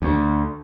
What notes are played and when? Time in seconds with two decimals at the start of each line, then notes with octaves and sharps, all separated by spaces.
0.02 D2